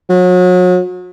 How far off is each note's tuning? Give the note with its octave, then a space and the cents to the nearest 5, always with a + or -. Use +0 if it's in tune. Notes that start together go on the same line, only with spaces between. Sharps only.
F#3 -35